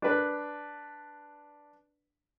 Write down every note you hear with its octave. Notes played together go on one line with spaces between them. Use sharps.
D4 B4